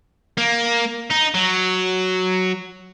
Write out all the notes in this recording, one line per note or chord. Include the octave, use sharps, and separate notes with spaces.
A#3
D#4
F#3